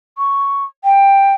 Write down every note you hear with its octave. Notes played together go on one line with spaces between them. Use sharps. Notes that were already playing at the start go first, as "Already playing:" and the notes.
C#6
G5